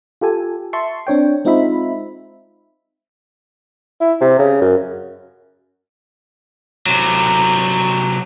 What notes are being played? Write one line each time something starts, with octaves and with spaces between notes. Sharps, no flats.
F4 G4 A4 G#5
E5 A5 C6 C#6
C4 D4 C#5 G5
G#3 C4 D#4 F4 E5 B5
E4
C3
C#3
F#2
C3 F#3